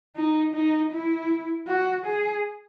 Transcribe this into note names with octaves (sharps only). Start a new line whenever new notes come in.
D#4
D#4
E4
F#4
G#4